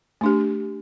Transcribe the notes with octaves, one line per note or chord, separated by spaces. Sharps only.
A3 D4 G4